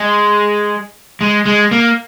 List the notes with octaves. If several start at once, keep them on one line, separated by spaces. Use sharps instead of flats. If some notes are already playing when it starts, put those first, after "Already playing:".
Already playing: G#3
G#3
G#3
A#3